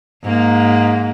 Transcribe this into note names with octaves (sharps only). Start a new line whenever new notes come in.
G#2 A#3